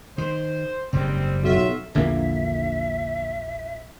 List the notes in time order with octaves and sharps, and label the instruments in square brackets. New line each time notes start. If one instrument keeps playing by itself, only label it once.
[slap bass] D#3 [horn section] C5
[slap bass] F#1 G#2 [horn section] G3 C4
[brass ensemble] B1 [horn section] F4 F#4 E5
[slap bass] A#1 E2 [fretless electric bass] D3 A#3 [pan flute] E5